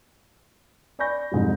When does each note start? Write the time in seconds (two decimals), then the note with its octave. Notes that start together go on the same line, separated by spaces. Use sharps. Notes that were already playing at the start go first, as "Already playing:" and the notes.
0.99 D5 G#5 B5 C#6 G6 A#6
1.32 F2 G#2 C3 F#3